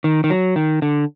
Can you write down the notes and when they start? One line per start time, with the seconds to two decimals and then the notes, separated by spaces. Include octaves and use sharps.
0.04 D#3
0.24 D#3
0.30 F#3
0.56 D#3
0.82 D3